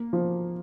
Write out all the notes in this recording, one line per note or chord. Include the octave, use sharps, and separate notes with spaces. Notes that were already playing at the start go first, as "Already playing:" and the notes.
Already playing: A#3
F3